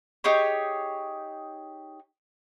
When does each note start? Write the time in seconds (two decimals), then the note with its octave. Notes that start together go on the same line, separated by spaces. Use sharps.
0.24 D#4 G4 G#4 C#5